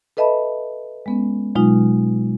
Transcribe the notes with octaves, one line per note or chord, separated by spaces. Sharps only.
A4 B4 D#5 E5 A5 B5
G#3 B3 C#4
B2 F#3 G#3 D#4 F4